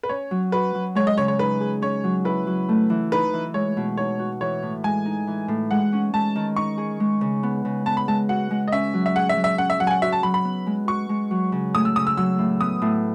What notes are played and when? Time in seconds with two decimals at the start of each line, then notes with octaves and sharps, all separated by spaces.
0.03 B4
0.09 C#4 C#5
0.31 F#3
0.52 F#4 B4
0.75 F#3
0.95 G#3 C#5
1.07 D#5
1.17 C#3 C#5
1.28 C#5
1.39 D#4 B4
1.60 G#4
1.82 C#4 C#5
2.04 F#3
2.25 E4 B4
2.47 F#3
2.69 A3
2.90 E3
3.12 D#4 B4
3.34 E3
3.54 G#3 C#5
3.77 B2
3.97 D#4 C#5
4.19 F#4
4.41 E3 C#5
4.62 A2
4.84 G#3 G#5
5.06 D#4
5.27 E3
5.48 A2
5.71 G#3 F#5
5.93 C#4
6.13 G#3 A5
6.36 D#3
6.56 D#4 C#6
6.78 G#4
7.00 G#3
7.21 C#3
7.43 B3
7.65 C#3
7.86 B3 A5
7.97 B5
8.08 G#3 A5
8.29 F#4 F#5
8.51 G#3
8.68 D#5
8.72 C#4 E5
8.94 F#3
9.06 E5
9.16 G#4 F#5
9.29 E5
9.37 F#3
9.44 E5
9.58 C#4 F#5
9.70 E5
9.80 F#3 F#5
9.87 G#5
9.91 F#5
10.02 F#4 E5
10.13 A5
10.23 F#3 B5
10.34 B5
10.45 B3
10.67 G#3
10.88 F#4 C#6
11.09 G#3
11.31 F#3
11.52 C#3
11.74 A3 D#6
11.85 E6
11.96 C#3 D#6
12.07 E6
12.17 F#3 E6
12.39 A2
12.61 B3 D#6
12.82 A2